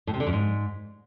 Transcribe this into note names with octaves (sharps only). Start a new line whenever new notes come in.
A2
C3
D3
F#2
G#2